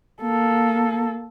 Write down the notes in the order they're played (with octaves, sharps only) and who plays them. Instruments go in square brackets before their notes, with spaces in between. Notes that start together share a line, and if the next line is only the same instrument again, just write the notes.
[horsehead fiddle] A#3 A4